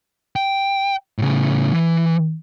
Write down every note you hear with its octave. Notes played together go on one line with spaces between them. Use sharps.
G5
A2 C#3
E3